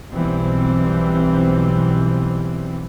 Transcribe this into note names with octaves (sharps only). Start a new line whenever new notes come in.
B1 B2 E3 G3 C4